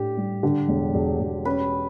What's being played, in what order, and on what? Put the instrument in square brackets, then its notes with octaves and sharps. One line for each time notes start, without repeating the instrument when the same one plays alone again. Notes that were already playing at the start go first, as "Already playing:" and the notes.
Already playing: [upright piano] A2 D4 [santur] G4
[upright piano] G3
D3
E1
E1
E1
[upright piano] C#4 [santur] B4